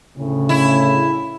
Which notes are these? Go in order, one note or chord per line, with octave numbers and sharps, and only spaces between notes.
D2 A2 C#3
E4